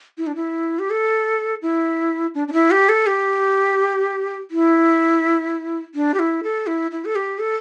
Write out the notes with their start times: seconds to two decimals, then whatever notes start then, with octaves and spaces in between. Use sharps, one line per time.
0.18 E4
0.27 D4
0.36 E4
0.79 G4
0.90 A4
1.62 E4
2.35 D4
2.48 D4
2.53 E4
2.71 G4
2.89 A4
3.06 G4
4.51 E4
5.95 D4
6.14 G4
6.19 E4
6.44 A4
6.67 E4
6.91 E4
7.05 A4
7.16 G4
7.39 A4